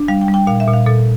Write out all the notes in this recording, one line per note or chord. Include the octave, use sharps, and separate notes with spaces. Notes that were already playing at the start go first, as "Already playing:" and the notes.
Already playing: D4
G3 F5
G5
G3
G5
A#2 F5
E5
A#2
F5
A#2 A4